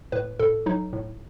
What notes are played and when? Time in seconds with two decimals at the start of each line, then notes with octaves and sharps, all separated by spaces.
0.12 A2 B4
0.39 A2 A4
0.66 F#3 D#4
0.93 A2